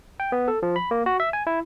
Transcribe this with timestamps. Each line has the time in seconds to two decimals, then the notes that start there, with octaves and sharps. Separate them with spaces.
0.20 G5
0.32 B3
0.48 A4
0.63 F3
0.76 B5
0.91 A#3
1.06 F#4
1.20 E5
1.33 G#5
1.47 E4